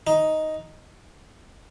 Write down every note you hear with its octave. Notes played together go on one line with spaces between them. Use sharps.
D#4